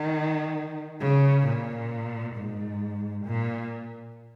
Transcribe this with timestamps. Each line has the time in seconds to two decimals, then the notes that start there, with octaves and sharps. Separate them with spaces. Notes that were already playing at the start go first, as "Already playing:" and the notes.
Already playing: D#3
1.01 C#3
1.46 A#2
2.35 G#2
3.25 A#2